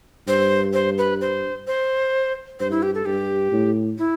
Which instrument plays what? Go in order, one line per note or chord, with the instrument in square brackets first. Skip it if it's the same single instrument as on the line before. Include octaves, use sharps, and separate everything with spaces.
[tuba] G2 [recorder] C5
[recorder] C5
B4
C5
C5
[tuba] G2 [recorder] C5
[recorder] E4
G4
A4
[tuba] G2 [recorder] G4
[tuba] A2
[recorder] E4